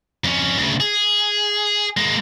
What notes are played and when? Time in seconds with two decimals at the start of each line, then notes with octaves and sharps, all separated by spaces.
0.24 F2 C#4
0.57 D2 C#3
0.80 G#4
1.97 G#3 A#3